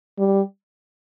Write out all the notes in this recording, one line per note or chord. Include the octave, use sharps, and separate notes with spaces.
G3